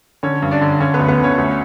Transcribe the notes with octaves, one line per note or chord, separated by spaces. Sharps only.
D3 C#4 C#5
G2
D4 D5
D3
D3 C#4 C#5
D2 B3 B4
B3 B4
D3 C#4 C#5
D2